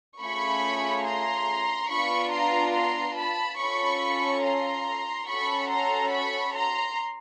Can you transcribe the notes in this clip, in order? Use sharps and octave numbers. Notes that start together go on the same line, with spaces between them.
A3 C#4 F4 G#4 B5 C#6
A#5 C6
B3 D4 F4 B5 C#6
A#5 C6
A#5 C6
A5 B5
C#4 F4 A4 B5 C#6
A#5 C6
C#4 F#4 A4 B5 C#6
A#5 C6
B5 C#6
A#5 C6